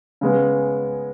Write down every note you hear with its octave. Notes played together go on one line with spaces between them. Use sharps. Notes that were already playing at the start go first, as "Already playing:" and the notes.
C#3 G#3 B3